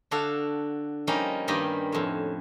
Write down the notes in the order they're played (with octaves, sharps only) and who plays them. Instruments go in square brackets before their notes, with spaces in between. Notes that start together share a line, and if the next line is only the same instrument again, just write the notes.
[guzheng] D3 D4 F#4 A4 F5
F3 G3 A#3 C#4 D#4
G2 D#3 A#3 G4 D#5 B5
F2 A2